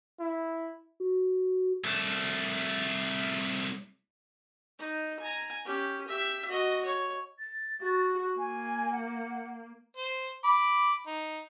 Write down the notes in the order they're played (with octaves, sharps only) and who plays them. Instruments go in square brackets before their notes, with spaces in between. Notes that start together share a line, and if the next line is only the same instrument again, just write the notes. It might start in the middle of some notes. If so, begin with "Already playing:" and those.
[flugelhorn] E4
[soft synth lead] F#4
[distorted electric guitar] C2 A3
[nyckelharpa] D#4
G#5 A#5
C#4 G4
G4 E5
F#4 D#5
C#5
[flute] A6
[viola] F#4
[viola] A#3 [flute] G#5
[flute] F#5
[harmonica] C5
B5 D6
D#4